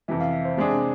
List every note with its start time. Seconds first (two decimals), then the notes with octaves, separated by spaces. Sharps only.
0.08 F2 C3 E3 E5
0.20 F5
0.33 E5
0.45 C5
0.57 C3 G#3 D4 G#4 C5